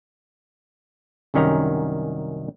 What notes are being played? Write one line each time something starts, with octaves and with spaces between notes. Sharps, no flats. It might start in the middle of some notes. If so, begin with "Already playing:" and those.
C2 F#2 D#3 C#4 G4 A#5